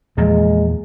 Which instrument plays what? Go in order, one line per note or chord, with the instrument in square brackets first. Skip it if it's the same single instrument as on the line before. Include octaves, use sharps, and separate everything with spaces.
[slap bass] E2 A#2 F3 [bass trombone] G#3